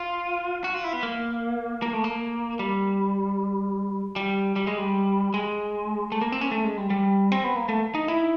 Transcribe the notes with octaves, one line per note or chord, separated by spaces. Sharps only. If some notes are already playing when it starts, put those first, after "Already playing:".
Already playing: F4
F#4
F4
E4
B3
A#3
A#3
A3
A#3
G3
G3
G3
G#3
G3
G#3
A3
A#3
C4
C#4
A3
G#3
G3
G3
C4
B3
A#3
A3
D#4
E4